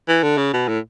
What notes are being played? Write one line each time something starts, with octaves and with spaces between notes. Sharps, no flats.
E3
D3
C#3
B2
A2